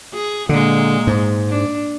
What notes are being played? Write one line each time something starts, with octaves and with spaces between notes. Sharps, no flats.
G#4
A#2 D3 G#3
G#2
D4